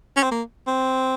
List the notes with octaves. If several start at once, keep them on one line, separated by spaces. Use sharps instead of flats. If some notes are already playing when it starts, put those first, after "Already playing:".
C#4
C4
A#3
C4